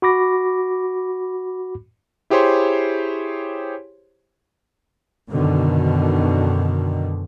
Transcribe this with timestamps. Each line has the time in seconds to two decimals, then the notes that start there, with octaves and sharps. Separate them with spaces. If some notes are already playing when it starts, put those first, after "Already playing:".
0.02 F#4 B5 D6 A#6
2.30 E4 G4 G#4 C5 C#5 C6
5.30 F#2 B2 D3 D#3